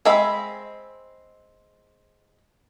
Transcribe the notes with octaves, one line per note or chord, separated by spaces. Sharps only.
G#3 C4 E5 B5